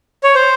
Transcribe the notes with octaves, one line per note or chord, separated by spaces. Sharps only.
C#5
C5